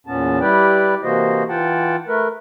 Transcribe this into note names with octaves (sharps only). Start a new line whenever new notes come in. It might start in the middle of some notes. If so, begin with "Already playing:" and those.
E2 A#2 B3 C#4 A5
G3 E4 G4 B4 D5 G5
C3 E3 A#3 F#4 C5 D#5
E3 F4 F#5 G5 A5
A3 A#4 B4